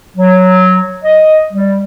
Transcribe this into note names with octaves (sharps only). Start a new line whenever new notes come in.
F#3
D#5
G3